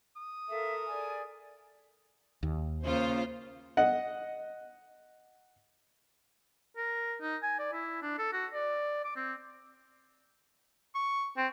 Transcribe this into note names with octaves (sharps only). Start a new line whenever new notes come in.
D#6
A4 A#4 E5 F5
G#4 D5 G#5
D#2
C#3 A#3 F4 C5
D#5 F#5
A#4
D#4
G#5
D5
E4
D4
A4
F#4
D5
D6
C4
C#6
C4